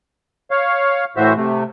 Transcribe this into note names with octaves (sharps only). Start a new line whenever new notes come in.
C#5 F5
A2 E3 F#4 C5 E5
C3 A3